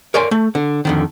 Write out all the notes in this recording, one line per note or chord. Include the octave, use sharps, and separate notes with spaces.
A#4 C#5 D5 G#5 C6
A3
D3
F2 D3 D#3